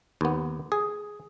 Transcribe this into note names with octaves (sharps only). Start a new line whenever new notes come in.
D#2 B3
G#4